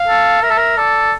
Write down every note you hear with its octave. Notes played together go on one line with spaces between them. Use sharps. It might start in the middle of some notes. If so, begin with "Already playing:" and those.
Already playing: F5
A4
A#4 E5
A4
A#4
A4 D5